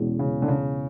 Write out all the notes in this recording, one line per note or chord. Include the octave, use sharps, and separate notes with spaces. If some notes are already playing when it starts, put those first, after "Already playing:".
Already playing: E2 B2 G#3 C#4
C#3
D3
C#3